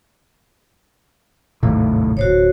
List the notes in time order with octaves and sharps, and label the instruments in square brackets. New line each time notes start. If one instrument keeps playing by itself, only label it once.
[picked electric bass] G#1 C3 A#3 [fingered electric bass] D#2 A2
[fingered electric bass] D1 [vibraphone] F#4 C5 C#5